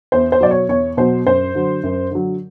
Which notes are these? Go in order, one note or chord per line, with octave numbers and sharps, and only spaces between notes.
E2 C5
C5
B2 F#3 D5
C#5
E2 C#5
B2 F#3 C5
F#2 C5
D3 F#3
F#2
D3 F#3